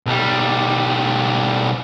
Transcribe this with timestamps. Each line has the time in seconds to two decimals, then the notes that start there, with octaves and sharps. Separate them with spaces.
0.06 B1 G3